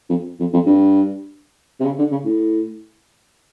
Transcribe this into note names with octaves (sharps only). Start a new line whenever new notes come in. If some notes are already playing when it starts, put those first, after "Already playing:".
F2
F2
F2
G2
C3
C#3
D3
C#3
A2